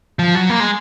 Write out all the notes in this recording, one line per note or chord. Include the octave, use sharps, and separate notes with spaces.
F3
F#3
A#3
G#3